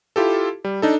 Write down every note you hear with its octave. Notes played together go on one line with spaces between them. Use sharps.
E4 F4 G4 A4
G3
D4 D#4 A4